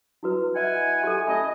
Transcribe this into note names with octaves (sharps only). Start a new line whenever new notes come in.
E4 F#4 B4
E4 D#5 F#5 G#5
G4 A4
A3 C#4 D#5 B5